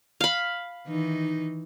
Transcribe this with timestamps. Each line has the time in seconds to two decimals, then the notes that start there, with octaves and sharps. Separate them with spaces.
0.21 F5 B5
0.87 D#3 E3 D#4